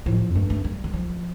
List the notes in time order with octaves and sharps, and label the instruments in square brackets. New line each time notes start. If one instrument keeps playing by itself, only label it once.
[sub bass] A2 [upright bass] F3
[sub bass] F2
[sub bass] G2 [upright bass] A3
[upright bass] A3
G3
G3
F3